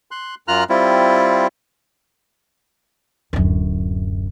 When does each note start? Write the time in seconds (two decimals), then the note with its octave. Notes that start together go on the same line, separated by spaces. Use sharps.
0.11 C6 F#6
0.48 F#2 F4 A#5 F6 F#6
0.70 G3 C4 E4 F4
3.33 D1 F#2